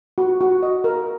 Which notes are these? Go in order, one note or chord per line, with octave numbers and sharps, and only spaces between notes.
F#4
F#4
D#5
A#4